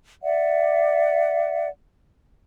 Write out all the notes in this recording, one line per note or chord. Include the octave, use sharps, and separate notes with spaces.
D5 E5 F#5